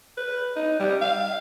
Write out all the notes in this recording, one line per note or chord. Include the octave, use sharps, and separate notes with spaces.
B4
D#4
G3
F5